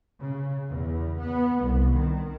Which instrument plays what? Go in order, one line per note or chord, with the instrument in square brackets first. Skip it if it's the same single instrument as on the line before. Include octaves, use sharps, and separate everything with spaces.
[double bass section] C#3
E2
B3
C2
D#3